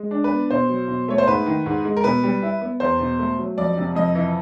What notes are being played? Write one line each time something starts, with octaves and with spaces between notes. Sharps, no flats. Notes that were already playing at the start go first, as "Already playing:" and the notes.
Already playing: G#3
D4
B4
B3
B2 C5
F#3
B2
A3 C#5
C5
G#2 B4
D#3
G#2
G#3
A#4
B2 B4
G3
E4
B3
E2 C5
B2
A3
F#3
F2 D5
C3
F2 D#5
E3